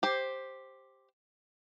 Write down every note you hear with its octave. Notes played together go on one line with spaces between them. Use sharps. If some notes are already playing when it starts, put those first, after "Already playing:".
G4 C5